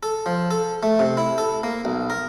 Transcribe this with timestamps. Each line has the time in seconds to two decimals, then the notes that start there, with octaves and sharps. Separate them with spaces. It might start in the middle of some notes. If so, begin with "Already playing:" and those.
0.03 A4
0.26 F3
0.51 A4
0.83 A3
0.99 C3
1.17 E4
1.38 A4
1.63 A#3
1.85 B1
2.10 A#4